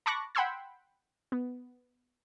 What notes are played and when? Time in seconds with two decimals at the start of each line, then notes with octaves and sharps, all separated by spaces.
0.06 A5 B5 C#6 D6 F#6 A#6
0.35 F#5 G5 B5 C6 E6 G#6
1.32 B3